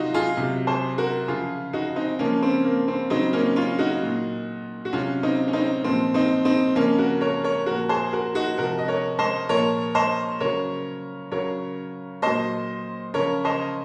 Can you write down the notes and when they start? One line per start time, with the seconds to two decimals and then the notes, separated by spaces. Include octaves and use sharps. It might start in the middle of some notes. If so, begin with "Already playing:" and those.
Already playing: C3 F#3 D#4 F4 F#4
0.14 F4 G#4
0.37 C3 F#3
0.67 G#4 C5
0.98 F#4 A#4
1.28 C#3 F3 F4 G#4
1.73 D#4 F#4
1.96 C4 D#4
2.19 C#3 F3 A#3 C#4
2.43 C4
2.64 A#3
2.88 C4
3.10 C#3 F#3 C4 D#4
3.33 A#3 C#4
3.56 C#4 F4
3.78 D#4 F#4
4.02 A#2 F#3
4.85 F#4
4.93 C3 F#3 C#4 F4
5.23 C4 D#4
5.48 C#4
5.53 C4 D#4
5.84 A#2 F3 C4
6.14 C4 D#4
6.45 C4 D#4
6.75 C#3 F3 A#3 C#4
6.98 F#4 A#4
7.21 A#4 C#5
7.44 A#4 C#5
7.66 A#2 F3 F#4 A#4
7.89 G#4 C5
8.13 F#4 A#4
8.35 D#4 F#4
8.58 C3 F3 F#4 A#4
8.79 D#5
8.88 A#4 C#5
9.19 C5 D#5
9.49 A#2 F3 A#4 C#5
9.95 C5 D#5
10.40 C#3 F#3 A#4 C#5
11.32 C#3 F#3 A#4 C#5
12.22 A#2 F#3 C5 D#5
13.14 C#3 F3 A#4 C#5
13.45 C5 D#5